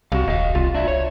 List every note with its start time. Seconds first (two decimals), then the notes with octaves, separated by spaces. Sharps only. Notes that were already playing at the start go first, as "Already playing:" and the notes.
0.12 C2 F#4 F5
0.28 D#1 D#5 F5
0.55 C2 F4
0.74 D4 E5
0.88 C#5